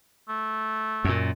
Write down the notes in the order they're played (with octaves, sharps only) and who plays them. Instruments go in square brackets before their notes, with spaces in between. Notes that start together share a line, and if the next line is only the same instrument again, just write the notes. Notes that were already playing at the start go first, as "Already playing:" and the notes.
[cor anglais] A3
[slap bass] F#2 A#2